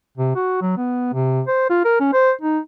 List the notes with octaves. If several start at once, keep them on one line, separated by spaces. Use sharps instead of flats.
C3
F#4
F#3
B3
C3
C5
F4
A#4
C#4
C5
D#4